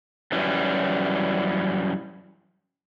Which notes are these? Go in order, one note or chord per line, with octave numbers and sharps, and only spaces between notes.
F#2 E3 G3 C#4